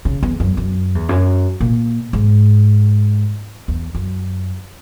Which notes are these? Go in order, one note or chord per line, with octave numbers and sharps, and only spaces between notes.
C#3
E2
F#2
F#2
E2
F#2
A#2
G#2
E2
F#2